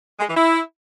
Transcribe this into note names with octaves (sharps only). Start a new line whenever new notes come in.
G#3
E3
E4